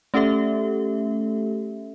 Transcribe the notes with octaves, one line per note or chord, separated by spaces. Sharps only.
A3 C#4 G4 A4 E5